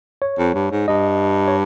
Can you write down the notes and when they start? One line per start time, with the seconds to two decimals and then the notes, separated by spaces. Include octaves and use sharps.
0.22 C#5
0.39 F2
0.55 G2
0.71 G#2
0.88 G2 D#5
1.48 C#5